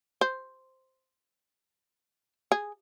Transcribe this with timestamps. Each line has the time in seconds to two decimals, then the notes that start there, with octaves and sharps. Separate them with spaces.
0.21 C5
2.52 G#4